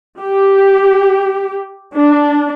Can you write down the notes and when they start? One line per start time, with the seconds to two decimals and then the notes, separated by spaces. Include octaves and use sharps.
0.20 G4
1.96 D4